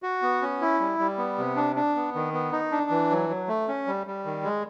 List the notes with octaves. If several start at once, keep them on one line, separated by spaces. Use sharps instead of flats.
F#4
B3
C#4
E4
G3
G3
B3
C3
D4
D4
B3
D#3
B3
D#4
D4
E3
F#3
F#3
A3
C#4
G3
G3
D#3
G#3